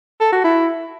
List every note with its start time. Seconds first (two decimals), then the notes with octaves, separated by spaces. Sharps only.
0.21 A4
0.32 F#4
0.44 E4